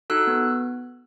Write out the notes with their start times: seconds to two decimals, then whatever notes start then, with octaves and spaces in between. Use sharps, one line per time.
0.10 D#4 F#4 A4 E6 F#6
0.27 B3